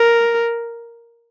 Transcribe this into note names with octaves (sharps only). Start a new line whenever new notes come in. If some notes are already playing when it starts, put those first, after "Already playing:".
Already playing: A#4